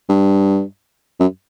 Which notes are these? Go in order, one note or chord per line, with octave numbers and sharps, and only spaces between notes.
G2
F#2